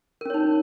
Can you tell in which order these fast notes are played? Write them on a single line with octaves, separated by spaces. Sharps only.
A#4 C#4 C#5 D#4